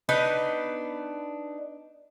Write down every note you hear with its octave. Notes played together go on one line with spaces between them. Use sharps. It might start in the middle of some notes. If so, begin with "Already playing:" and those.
B3 D4 D#4 B4